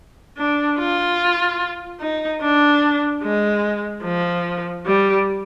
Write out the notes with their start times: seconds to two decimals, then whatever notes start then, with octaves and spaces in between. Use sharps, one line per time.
0.38 D4
0.79 F4
2.01 D#4
2.41 D4
3.23 G#3
4.04 F3
4.85 G3